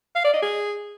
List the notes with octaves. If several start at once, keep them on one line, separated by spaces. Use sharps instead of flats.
F5
D5
D#5
G#4